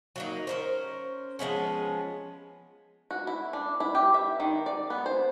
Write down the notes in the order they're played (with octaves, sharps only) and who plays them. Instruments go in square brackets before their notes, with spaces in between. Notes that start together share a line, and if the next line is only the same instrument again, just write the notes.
[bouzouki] F#3 A#3 D#4
C#4 A#4 C5
F3 G#3 B3 C#4
[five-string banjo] F#4
E4
D4
E4
G4
E5
D#3
D5
B3
C5